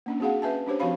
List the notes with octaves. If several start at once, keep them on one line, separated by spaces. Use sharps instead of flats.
A#3 C#4 D4
C4 F#4 G#4 F5 F#5
C#4 B4 E5 G#5 A5
C#4 D4 G4 C5 C#5
F3 C4 F#4 C#5 F5 B5